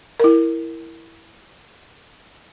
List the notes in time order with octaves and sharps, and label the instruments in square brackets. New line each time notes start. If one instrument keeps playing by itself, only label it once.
[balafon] E4 A#4